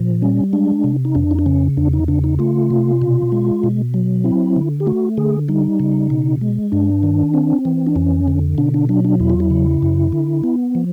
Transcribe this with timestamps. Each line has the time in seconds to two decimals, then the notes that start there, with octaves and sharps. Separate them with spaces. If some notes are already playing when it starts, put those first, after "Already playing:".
Already playing: A#2 F3
0.22 G3 C#4
0.53 G#3 D4
0.84 C3
1.05 D#4
1.15 F2 D4
1.31 D#4
1.39 D4
1.46 C#3 C#4
1.77 E2 D4
1.93 D#4
2.08 C#3 D4
2.24 D#4
2.39 A3 F4
2.70 C3
3.02 B2
3.32 G#3
3.64 B2
3.94 F#3
4.24 C4 E4
4.56 D3
4.80 G4
4.86 A3 F#4
5.17 D3 G#4
5.49 G3 D#4
5.80 C#3
6.10 B2
6.41 G#3
6.72 G2 D4
7.03 D#3
7.34 C4
7.65 E3
7.87 D4
7.96 F2 C#4
8.28 D3
8.58 B2 D4
8.74 D4
8.89 F#3 D4
9.04 D4
9.20 E2 E4
9.30 F4
9.40 E4
9.50 C#3
9.82 F#2
10.12 D3
10.44 B3
10.75 F3